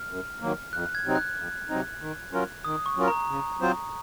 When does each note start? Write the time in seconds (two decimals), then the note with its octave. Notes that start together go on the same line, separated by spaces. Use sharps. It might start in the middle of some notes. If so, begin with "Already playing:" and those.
Already playing: F6
0.09 F#2
0.41 D#3 F#3 A#3
0.73 F2 F#6
0.95 G#6
1.05 C3 F#3 C4 D#4
1.15 F#6
1.37 F2
1.69 C3 F#3 C4 D#4
2.01 D#3
2.33 F#3 C#4 F4 A#4
2.64 D#3 D#6
2.86 C#6
2.96 F#3 C#4 F4 A#4
3.08 A#5
3.29 C#3
3.61 F#3 C4 F4 C5